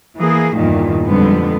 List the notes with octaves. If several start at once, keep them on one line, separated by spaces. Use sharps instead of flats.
E3 A#3 G#4
E2 G2 A#2 D#3
F2 D3 G3 G#3 B3